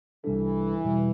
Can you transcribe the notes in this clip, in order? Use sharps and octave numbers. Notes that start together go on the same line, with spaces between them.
C2 C3 E3 G3 D4 A4
E2 B2 G3